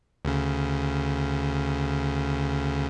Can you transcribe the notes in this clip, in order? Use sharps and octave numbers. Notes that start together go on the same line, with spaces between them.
D2 C#3